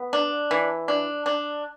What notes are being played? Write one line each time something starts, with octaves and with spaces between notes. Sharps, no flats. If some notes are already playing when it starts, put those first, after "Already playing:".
Already playing: B3
D4
E3
D4
D4